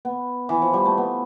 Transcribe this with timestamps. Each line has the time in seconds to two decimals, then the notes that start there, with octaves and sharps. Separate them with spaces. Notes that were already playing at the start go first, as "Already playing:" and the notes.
0.05 B3
0.49 E3
0.62 F3
0.74 G3
0.85 A3
0.98 B3